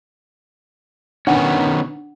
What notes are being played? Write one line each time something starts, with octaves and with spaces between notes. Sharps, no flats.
D#3 B3 C#4 D4 F#5